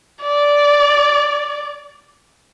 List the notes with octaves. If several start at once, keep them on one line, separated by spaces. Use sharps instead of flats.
D5